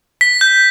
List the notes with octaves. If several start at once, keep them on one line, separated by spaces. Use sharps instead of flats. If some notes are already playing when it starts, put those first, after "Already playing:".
B6
G6